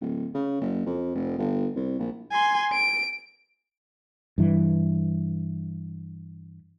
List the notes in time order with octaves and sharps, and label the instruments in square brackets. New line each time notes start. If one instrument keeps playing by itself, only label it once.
[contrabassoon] D1
C#3
F#1
F2
F1
G1
C2
A#1
[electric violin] G#5 C6
D7
[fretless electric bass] G2 E3